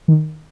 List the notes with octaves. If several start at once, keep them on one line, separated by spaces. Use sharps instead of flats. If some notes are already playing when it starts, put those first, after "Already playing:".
D#3